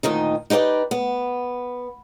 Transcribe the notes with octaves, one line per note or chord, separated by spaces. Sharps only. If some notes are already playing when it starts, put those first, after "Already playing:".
D2 A#2 D#3 D#4
D#4 G4 B4 C#5 D5
B3